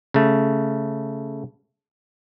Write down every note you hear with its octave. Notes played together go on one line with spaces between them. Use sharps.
C#3 A3